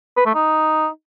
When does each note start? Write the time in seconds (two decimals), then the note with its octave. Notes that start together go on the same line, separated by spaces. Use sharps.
0.17 B4
0.26 A3
0.35 D#4